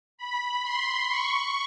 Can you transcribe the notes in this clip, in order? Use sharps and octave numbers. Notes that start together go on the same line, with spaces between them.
B5
C6
C#6